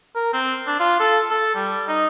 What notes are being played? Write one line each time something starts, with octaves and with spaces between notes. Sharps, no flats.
A#4
C4
D4
F4
A4
A4
G3
D#4